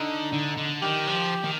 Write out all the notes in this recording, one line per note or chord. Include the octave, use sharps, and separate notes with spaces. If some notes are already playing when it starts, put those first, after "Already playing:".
Already playing: D3 D#4
D3
D3
D#3 G4
F3
D#3